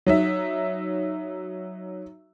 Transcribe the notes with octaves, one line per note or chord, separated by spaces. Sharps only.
F#3 D#4 E5